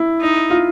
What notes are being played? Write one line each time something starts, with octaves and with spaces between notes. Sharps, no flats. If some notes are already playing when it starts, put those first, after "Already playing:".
Already playing: E4
D#4
F4